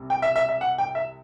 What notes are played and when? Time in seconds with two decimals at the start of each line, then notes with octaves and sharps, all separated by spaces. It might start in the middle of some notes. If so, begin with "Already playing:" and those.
Already playing: C2 C3
0.10 G5
0.22 E5
0.36 E5
0.49 E5
0.61 F#5
0.78 G5
0.95 E5